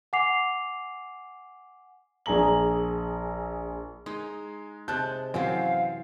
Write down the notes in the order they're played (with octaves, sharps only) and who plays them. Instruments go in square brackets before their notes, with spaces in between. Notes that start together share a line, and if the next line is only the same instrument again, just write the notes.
[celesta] F#5 G#5 D6 C7 F7
[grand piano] A#1 G#4 A#5 F#7
[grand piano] G#3 [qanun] D#4
[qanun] C3 G#3 [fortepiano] A5 F#6 [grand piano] G6
[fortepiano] F#2 [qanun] E3 F#4 G4 [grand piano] C4 [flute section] F5